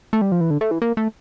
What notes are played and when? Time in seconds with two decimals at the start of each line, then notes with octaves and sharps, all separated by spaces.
0.13 A3
0.22 G3
0.32 F3
0.41 E3
0.50 D3
0.61 A3
0.71 E3
0.82 A#3
0.97 A3